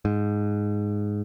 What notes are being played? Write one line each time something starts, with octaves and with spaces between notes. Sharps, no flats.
G#2